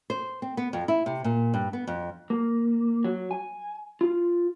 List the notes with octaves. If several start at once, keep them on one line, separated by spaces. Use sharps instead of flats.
C5
C4
B3
F2
E4
C3
A#2
G2
B3
F2
A#3
F#3
G#5
F4